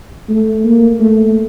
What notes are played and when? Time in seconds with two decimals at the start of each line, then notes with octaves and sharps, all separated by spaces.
0.28 A3
0.64 A#3
0.99 A3